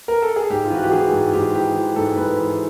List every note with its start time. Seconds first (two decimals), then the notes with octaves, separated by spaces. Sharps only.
0.08 A#4
0.22 A4
0.36 G#4
0.50 G#2 G4
0.65 F4
0.70 E3 F#4
0.84 G4
0.92 E3 G#4
1.12 G#2
1.33 G#2 G4
1.55 E3 G4
1.75 E3
1.96 G#2 A4
2.16 G#2 B4
2.38 E3